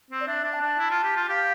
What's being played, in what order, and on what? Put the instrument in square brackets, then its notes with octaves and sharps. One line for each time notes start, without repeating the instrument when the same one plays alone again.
[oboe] C4
[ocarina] D5
[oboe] D4 [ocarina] E5
[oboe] D4
[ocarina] A5
[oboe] D4
E4
F4
G4
F4
[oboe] G4 [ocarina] F5